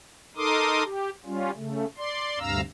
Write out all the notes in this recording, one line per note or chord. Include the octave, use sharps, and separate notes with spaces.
D#4 A4 A#4 C6 D6 D#6
G4
G3 C#4 F4
C#3 A3
D5 C6
D2 G2 C3 F5 A#5 E6